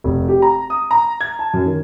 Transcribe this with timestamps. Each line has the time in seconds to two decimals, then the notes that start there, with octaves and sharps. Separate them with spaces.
0.04 F1
0.28 G4
0.42 A#5
0.70 D#6
0.91 A#5
1.21 G#6
1.39 A5
1.54 F#2
1.66 D#3